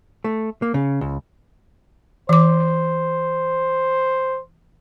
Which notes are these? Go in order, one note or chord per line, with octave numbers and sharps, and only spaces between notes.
A3
A#3
C#3
C#2
E3 C5 D6